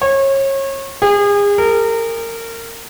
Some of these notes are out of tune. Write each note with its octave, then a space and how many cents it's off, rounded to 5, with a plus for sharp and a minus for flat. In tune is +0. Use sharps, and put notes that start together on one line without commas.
C#5 -30
G#4 -35
A#4 -25